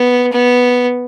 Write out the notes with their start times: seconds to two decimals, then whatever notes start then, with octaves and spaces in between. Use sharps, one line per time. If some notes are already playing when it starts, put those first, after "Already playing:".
Already playing: B3
0.32 B3